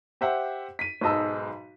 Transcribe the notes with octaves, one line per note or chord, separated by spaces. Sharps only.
G4 C5 E5 F#5
B6 D#7
B1 G#2 D#5 A5 E6